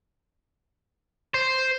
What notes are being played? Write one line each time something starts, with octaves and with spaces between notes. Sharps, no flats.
C5